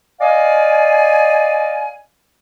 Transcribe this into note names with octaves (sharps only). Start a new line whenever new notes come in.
D5 D#5 F5 G#5